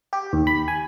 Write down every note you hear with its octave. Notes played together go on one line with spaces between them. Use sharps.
G4
D#2
B5
G#5